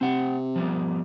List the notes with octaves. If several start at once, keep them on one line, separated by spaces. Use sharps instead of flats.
C3 C4 F#5
F3 G3 B3